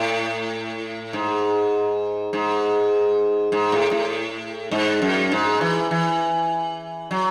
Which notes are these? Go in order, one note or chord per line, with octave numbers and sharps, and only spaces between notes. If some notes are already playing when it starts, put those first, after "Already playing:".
Already playing: A2
G#2
G#2
G#2
A2
A2
G#2
F#2
G#2
E3
E3
F#3